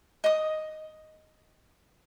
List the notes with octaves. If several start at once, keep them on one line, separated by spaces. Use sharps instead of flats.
D#5 D#6